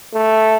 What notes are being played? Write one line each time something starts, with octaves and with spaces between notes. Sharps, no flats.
A3